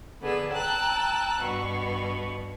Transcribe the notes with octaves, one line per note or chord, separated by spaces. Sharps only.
D3 B3 G#4 D5 E6
G5 A5 A#5 E6 F#6
G2 B2 C#6